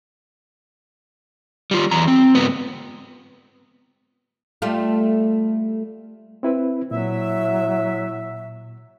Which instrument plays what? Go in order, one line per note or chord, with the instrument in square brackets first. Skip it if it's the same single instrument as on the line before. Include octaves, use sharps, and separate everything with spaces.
[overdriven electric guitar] G3 F4
E2 A#5
C4
G#2 B3
[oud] G3 A3 F4
[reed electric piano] C4 E4 B4
[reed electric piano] A#2 [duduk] F#3 [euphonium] E4 [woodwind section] E5